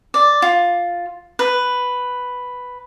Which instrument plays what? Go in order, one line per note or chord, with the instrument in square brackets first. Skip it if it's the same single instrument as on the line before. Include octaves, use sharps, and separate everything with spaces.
[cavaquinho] D5
F4
B4